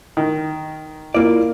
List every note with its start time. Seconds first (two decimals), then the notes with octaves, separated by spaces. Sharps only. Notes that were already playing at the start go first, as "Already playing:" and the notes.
0.17 D#3
1.15 A#3 E4 F4 D5